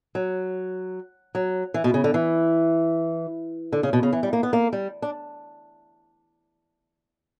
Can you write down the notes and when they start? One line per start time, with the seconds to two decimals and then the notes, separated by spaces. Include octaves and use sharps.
0.15 F#3
1.35 F#3
1.74 E3
1.84 B2
1.94 C#3
2.04 D3
2.14 E3
3.73 D3
3.83 C#3
3.93 B2
4.03 C#3
4.12 E3
4.23 G3
4.33 A#3
4.43 B3
4.53 A#3
4.73 G3
5.02 D4